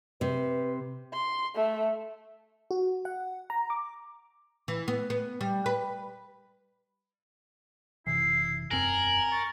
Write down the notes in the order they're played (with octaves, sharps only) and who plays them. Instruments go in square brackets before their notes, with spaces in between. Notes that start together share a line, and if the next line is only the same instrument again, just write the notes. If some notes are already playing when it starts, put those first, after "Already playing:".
[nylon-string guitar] C3 [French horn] B4
[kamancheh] C6
A3 E5
[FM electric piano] F#4
F#5
A#5
D6
[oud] E3
B3
B3
G3
B4
[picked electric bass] F#1 C3 E3 [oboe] E4 [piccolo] C7
[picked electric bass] E1 F#2 C4 [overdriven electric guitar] A#4 [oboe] G#5 [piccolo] F#7
[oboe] C#6 [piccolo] A6